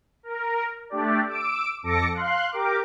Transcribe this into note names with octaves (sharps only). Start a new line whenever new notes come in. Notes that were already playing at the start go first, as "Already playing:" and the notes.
A#4
A3 D4 G4 D5
D6 E6 D7
F2 A4 D6 A#6 C#7
F5 C6 F#6
G4 A#4 D6